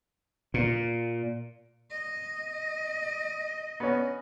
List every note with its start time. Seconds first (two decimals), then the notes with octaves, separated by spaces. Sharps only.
0.54 A#2
1.91 D#5
3.80 B3 C#4